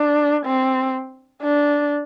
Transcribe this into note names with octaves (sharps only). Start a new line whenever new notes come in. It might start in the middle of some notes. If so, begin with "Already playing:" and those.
Already playing: D4
C4
D4